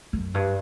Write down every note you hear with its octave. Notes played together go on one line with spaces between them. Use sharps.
F#2
G2